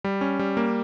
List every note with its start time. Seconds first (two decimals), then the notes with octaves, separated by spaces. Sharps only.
0.04 G3
0.21 C#4
0.39 G3
0.57 A#3